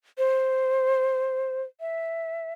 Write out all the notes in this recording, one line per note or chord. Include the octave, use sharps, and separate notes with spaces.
C5
E5